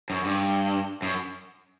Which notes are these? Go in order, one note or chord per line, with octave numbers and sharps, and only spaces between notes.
F#2
G2
F#2